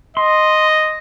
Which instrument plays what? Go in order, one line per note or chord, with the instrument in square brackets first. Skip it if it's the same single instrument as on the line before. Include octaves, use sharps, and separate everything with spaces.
[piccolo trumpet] D#5 [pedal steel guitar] C6